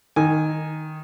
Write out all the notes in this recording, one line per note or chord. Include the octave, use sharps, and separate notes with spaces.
D#3 G#5